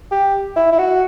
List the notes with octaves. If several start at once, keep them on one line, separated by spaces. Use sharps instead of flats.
G4
E4
E4
F#4